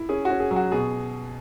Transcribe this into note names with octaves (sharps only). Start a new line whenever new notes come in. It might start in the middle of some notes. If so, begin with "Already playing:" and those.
Already playing: E4
C#4 G#4
F#4
C#4
G#4
F#3
F#4
B2 G#4